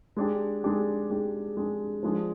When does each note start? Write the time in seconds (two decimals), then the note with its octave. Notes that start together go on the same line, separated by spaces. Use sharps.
0.17 G#3 D4 G4
0.64 G#3 D4 G4
1.10 G#3 D4 G4
1.57 G#3 D4 G4
2.03 F3 G#3 D4 G#4